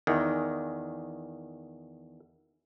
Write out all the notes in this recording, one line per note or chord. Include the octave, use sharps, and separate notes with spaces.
E2 D#3